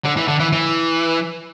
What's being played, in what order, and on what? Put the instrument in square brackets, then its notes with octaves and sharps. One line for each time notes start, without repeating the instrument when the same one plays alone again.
[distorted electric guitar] D3
E3
D3
E3
E3